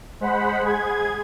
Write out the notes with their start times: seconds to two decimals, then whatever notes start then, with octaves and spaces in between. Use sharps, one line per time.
0.20 G#3 C5 F#5 B5
0.61 G#4 G#6